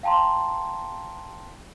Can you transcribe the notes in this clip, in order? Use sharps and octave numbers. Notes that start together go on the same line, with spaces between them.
F5 G5 A5 A#5 C6